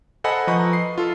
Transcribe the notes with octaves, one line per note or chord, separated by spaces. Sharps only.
A4 C5 D#5 F#5 G#5 B5
F3 B4 D#5 A#5 B5 C#6
C7
F4 A4